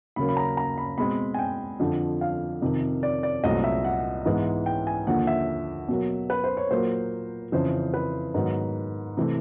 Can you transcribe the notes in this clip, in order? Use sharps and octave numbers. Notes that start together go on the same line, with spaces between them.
D#2 C#3 F#3 A#3 B5
B5
A#5
A#5
B5
B2 G#3 C4 B5
G#5
G5
F2 D3 F3
F5
F2 C3 D#3
D5
D5
C2 A#2 F#3 A3 C4 D#5
E5
F#5
G#2 E3 G#3 B3
G5
G#5
D#2 D3 F3 F#5
E5
B2 F#3 A#3
B4
C5
C#5
A#2 F#3 A#3 C5
F2 C#3 E3 C5
B4
G#2 D#3 F#3 B3
C3 E3 A3 C4